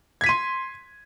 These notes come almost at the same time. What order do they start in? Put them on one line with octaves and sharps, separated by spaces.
G#6 B6 D#7 C6